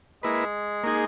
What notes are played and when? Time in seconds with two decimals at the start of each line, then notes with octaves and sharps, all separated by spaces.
0.23 G#3 A#3 E4 B4
0.84 A#3 D#4 G#4